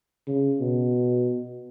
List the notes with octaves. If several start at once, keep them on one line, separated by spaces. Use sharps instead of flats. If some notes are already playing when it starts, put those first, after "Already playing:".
C#3
B2